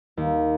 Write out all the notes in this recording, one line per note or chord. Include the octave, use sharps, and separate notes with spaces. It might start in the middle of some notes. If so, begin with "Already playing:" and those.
D#2